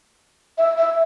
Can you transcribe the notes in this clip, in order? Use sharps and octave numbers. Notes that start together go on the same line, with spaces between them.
E5
E5